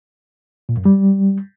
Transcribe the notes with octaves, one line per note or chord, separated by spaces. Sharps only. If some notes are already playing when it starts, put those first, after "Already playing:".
A#2
F#2
G3